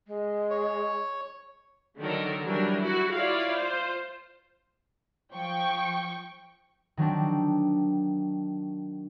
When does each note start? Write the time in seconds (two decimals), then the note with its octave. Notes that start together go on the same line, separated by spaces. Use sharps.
0.07 G#3
0.50 C#5
1.99 D3 D#3 F#3 A4 A#4
2.44 E3 F#3 G3 D4 A#4
2.80 E4 F#4
3.16 E4 F4 C#5 D5 F5
3.57 F4 C5
5.34 F3 G5 C#6
6.97 D#3 F#3 C4 D4